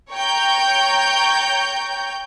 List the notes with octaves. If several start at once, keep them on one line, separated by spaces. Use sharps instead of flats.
C#5 G5 A#5 G6